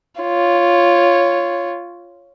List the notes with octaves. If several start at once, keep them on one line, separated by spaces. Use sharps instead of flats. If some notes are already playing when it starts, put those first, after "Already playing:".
F4 C#5